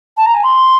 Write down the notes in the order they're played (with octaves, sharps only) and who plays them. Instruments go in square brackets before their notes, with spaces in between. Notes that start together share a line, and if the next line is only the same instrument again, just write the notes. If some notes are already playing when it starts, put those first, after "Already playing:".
[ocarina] A5
A#5
G#5
C6